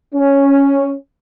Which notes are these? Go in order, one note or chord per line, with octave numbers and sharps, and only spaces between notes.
C#4